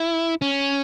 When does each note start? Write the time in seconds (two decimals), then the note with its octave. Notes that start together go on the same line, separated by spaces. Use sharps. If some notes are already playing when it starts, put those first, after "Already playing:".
Already playing: E4
0.42 C#4